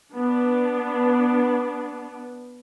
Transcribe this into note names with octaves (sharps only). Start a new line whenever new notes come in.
B3 D4